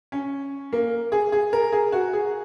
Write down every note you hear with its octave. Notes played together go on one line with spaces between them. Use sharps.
C#4
A#3
G#4
G#4
A#4
G#4
F#4
G#4